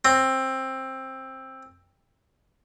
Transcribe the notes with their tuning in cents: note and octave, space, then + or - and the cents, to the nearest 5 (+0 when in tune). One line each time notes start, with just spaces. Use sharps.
C4 +15